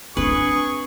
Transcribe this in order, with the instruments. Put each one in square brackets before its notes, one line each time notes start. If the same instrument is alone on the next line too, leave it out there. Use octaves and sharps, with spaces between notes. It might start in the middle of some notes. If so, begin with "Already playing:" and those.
[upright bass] C4 D4 [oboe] G#4 [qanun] B4 [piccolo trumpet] C#6